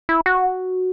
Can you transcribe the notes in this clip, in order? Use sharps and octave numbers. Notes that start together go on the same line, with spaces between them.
E4
F#4